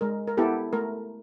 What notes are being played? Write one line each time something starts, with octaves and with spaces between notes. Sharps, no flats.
G#3 A#4
A#4
B3 E4 G4 A4
A3 A#4